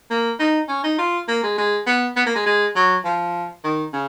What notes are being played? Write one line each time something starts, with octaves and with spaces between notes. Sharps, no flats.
A#3
D#4
C#4
D#4
F4
A#3
G#3
G#3
B3
B3
A#3
G#3
G#3
F#3
F3
D#3
C#3